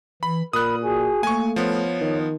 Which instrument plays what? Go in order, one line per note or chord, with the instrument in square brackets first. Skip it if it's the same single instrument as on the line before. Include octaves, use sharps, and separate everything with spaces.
[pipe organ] E3 [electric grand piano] B5
[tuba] A#2 [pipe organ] A#4 B5 [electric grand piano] D#6 F#6
[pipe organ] F#4 G#4 G#5
[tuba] A3 [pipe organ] A#3 [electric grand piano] G#5 C#6
[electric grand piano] F3 B3 [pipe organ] C#5
[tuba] D#3